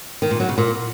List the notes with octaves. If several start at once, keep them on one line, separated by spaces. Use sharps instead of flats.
D#3
A#2
F#3
C#3
A#2